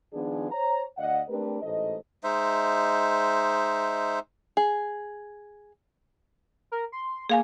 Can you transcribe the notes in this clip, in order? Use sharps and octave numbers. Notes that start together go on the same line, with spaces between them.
D#3 F3 G#3 B3 D4 G#4
C5 C#5 A#5
D2 D5 D#5 F5 F#5
A3 C4 D4 G4 A#4 B4
A1 G#2 A3 C5 D#5
G#3 D#4 C5 E5
G#4
A#4
C6
A#3 G#4 F5 G#5